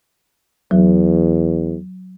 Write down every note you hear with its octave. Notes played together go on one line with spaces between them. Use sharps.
E2 F#3